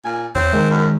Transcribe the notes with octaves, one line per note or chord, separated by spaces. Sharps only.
A#2 G#5
E2 C4 C#5
D#3 G#3 A#4
F#2